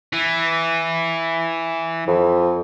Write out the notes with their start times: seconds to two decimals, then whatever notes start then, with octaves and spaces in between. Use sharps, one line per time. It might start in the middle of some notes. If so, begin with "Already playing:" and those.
0.13 E3
2.07 F2